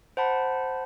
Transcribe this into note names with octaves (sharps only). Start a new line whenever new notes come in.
C5 F#5 A5 B5